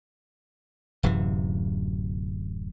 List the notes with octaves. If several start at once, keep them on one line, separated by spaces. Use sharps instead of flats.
D1 F#2 C3 E3